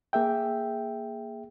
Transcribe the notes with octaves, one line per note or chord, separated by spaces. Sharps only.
A#3 G#4 E5 G5